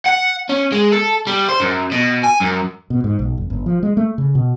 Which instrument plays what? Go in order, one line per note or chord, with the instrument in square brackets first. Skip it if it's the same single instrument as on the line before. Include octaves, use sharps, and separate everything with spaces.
[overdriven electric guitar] F#5
C#4
G#3
A4
G3
C5
F#2
B2
G#5
F#2
[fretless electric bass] B2
G#2
B1
F1
G1
F3
G#3
A3
C#3
B2